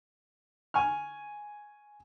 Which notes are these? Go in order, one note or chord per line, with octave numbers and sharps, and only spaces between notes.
G#5 C#6 F6